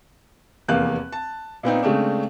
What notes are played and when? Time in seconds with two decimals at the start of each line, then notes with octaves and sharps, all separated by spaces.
0.68 F1 E2 A#3 F5 F#6
1.12 A5
1.63 A#2 B3 C4 D#4
1.83 C#3 G#3 A3 C4 D4